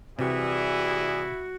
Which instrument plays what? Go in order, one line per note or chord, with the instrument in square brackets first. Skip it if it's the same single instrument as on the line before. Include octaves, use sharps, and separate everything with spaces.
[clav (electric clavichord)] C3 [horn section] E3 G3 G#4 [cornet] E4 [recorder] F#4